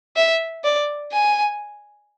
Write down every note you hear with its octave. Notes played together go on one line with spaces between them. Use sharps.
E5
D5
G#5